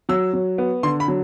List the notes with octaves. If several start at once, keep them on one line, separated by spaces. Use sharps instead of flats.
F#3 E6
F#3
B3
D3 C6
B5
F#3